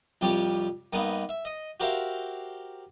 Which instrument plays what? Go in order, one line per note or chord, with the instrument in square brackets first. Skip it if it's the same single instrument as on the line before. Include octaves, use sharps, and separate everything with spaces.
[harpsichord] C2 F2 G4 C#5 D5
G2 A#3 B3 D#4
E5
D#5
F#4 G4 A#4 C5 E5 F5